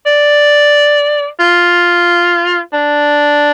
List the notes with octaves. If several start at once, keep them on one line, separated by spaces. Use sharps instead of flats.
D5
F4
D4